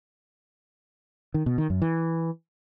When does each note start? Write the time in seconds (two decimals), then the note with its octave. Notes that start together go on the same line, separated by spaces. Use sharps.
1.34 D#3
1.46 B2
1.58 D#3
1.70 F#2
1.82 E3